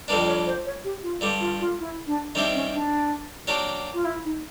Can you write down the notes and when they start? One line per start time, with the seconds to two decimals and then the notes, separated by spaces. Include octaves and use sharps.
0.08 F2 D3 G3 A#3 D4 B4
0.27 C#5
0.46 C5
0.65 C#5
0.84 G4
1.03 F4
1.21 G2 D3 G3
1.40 F4
1.60 F4
1.79 E4
2.06 D4
2.35 D#3 G3 C4 D4 E4 G4
2.54 C#4
2.72 D4
3.47 F#3 A#3 D4 G4
3.94 F4
4.04 E4
4.24 D#4